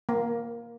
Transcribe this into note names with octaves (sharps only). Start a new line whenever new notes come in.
A#3